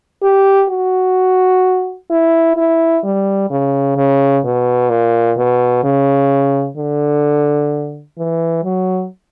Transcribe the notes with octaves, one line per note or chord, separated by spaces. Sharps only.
G4
F#4
E4
E4
G3
C#3
C#3
B2
A#2
B2
C#3
D3
E3
F#3